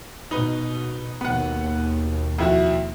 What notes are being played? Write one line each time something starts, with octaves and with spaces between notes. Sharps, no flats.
B2 D#4 B4
D#2 B2 B3 F#5
F2 E4 F#4